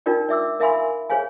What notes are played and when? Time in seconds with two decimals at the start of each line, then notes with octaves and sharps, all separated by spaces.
0.06 D4 D#4 F4 A#4 D5 G5
0.29 D5 E5 D6 E6
0.60 A#4 E5 F5 G#5 B5 C6
1.09 G#4 C5 C#5 F5 G#5